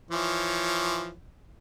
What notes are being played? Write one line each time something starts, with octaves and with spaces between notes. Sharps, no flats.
E3 F3 C#5